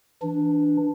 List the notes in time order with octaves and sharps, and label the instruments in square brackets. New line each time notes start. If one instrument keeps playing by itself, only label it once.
[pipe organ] E3 D4